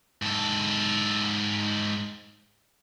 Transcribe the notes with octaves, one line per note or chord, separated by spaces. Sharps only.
G#2 A4